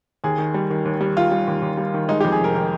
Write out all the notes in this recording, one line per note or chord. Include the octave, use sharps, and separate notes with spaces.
D#2 G#4
D#3
G3
D#3
D#2
G3
D#3 F4
G3
D#2
D#2
G3
D#3
G#3 D#4
G4
F2
G#4
F1 A#4
D#3 A#4